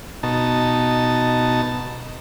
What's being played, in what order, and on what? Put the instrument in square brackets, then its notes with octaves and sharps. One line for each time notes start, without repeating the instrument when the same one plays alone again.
[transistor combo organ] B2 D#4 A5